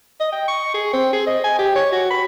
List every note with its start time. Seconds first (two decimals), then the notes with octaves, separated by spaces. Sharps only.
0.20 D#5
0.32 G5
0.48 C#6
0.74 G#4
0.93 C4
1.13 G#4
1.27 D#5
1.44 G#5
1.59 G4
1.76 C#5
1.92 F#4
2.10 B5